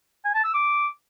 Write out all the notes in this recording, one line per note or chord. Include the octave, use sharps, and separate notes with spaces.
G#5
A5
E6
D6